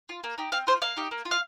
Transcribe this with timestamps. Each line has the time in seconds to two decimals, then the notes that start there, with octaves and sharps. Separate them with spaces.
0.09 F4
0.24 A#3
0.38 D#4 G4
0.52 C4 F5
0.67 F4 C5
0.82 A#3 F5
0.96 D#4 G4
1.11 A#3
1.25 F4
1.31 F5